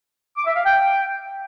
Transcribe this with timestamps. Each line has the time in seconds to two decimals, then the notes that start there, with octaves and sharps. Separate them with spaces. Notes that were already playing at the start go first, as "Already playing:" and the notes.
0.37 D6
0.46 E5
0.55 F5
0.64 G5